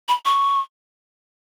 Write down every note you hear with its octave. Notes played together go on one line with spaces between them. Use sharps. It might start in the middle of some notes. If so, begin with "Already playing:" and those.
B5
C#6